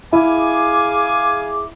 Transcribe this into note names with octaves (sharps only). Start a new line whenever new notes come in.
E4 G#4 F5 G#5 D6